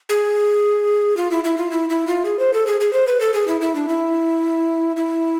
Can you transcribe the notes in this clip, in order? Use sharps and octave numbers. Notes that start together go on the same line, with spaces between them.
G#4
F4
E4
E4
F4
E4
E4
F4
G#4
C5
A4
G#4
G#4
C5
B4
A4
G#4
E4
E4
D4
E4
E4